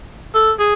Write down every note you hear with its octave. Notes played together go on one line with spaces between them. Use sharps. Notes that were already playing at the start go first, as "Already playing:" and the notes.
A4
G#4